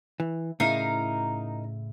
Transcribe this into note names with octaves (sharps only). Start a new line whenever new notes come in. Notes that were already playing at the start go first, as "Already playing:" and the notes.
E3
A2 C#3 D#4 E4 A#4 F5